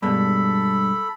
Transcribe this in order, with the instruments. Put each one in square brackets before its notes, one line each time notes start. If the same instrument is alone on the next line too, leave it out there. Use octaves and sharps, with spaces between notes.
[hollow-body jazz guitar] G2 B2 G#3 [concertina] A4 B5